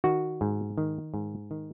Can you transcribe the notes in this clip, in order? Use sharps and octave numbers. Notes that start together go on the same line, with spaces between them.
D#3 F#4
G#2
D#3
G#2
D#3